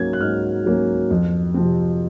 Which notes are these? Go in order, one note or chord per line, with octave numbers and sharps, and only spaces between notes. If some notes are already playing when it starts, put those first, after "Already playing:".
Already playing: G#2 F#3 A#3 C#4 G#6
F#6
G#2 F6
F#3 A#3 C#4
F2
C3 F3 C4